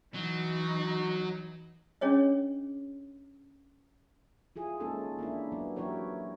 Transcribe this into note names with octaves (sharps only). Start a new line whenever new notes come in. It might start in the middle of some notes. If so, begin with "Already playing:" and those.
E3 F#3 D#4
C#4 D4 G#4 C#5 D#5
E4 F4 G#4
G#3 A#3 C#4 D#4 E4 A4
A#3 D4 E4
F#3 B3 E4
F#3 A#3 E4 G4 A#4 C#5